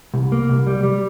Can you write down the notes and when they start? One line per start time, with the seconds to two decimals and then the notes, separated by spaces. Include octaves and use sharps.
0.14 C2
0.32 A#3
0.49 C2
0.67 G3
0.83 G3